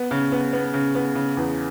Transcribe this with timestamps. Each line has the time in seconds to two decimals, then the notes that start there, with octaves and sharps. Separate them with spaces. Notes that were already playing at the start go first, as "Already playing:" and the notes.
Already playing: B3
0.11 C#3
0.32 B3
0.53 B3
0.74 C#3
0.95 B3
1.15 C#3
1.37 E2